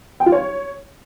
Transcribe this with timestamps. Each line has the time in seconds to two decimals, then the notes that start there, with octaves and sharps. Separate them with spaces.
0.20 G5
0.26 F4
0.32 C#5